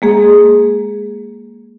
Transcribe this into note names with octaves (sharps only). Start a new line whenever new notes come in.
G#3 A#3 G#4